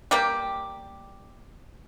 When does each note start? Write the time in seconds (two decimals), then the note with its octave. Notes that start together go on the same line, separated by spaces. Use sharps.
0.11 G3 A#3 G4